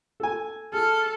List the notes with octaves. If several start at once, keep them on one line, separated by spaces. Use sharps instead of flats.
A4 G#5
G#4 A4 F6